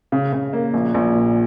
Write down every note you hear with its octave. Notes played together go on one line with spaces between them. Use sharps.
C#3
C#3
A#3
A#1
A#1
A#2